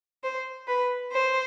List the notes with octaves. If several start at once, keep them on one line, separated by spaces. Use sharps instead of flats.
C5
B4
C5